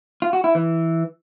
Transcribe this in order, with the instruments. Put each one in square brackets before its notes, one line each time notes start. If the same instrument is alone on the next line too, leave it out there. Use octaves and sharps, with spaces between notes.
[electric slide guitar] F4
F#4
E4
E3